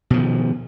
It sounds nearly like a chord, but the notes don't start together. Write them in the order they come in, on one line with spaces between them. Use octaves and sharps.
B2 F3 D#3